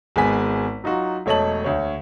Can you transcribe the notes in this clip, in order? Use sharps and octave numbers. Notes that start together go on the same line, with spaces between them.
G#1 G#3 B3 G#5 B6
F#3 D#4 F4 F#4
E1 A3 C#5 D#5 A5 F#7
D2 C#5